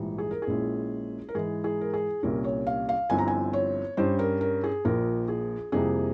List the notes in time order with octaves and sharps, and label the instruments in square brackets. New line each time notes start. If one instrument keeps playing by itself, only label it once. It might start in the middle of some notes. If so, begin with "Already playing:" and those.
Already playing: [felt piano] A#1 G#2 E3 G3
G#4
A#4
G#4
A#1 A#2 G#3 C#4 E4
A#4
G#2 E3 G#3 G#4
G#4
A#4
G#4
C2 A#2 G3 C#4 A#4
C#5
F5
F5
G1 G2 F3 C4 E4 G#5
A#5
G#5
C#5
G2 G3 C#4 C5
A#4
A#4
G#4
A#1 A#2 F3 A#4
G#4
F2 C3 G3 A#3 E4 G#4